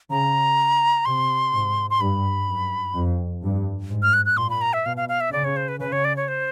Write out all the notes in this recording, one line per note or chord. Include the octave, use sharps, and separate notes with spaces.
C#3 A#5
C3 C6
G#2
C6
G2 B5
F#2
F2
G2
G#2
F6
F#6
F#6
A#2 C6
B5
A#5
E5
B2 F5
F5
F5
E5
C#3 D5
C#5
C5
B4
C#3 B4
C#5
D5
C#5
C5